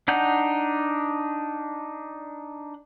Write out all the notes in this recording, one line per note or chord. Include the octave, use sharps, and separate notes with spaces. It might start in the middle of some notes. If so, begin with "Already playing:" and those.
D4 D#4 F#5 G6